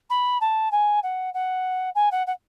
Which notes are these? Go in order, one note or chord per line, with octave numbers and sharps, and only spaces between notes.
B5
A5
G#5
F#5
F#5
G#5
F#5
F#5